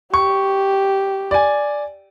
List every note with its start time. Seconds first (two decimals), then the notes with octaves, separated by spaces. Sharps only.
0.14 G4 C#6
1.31 D5 G#5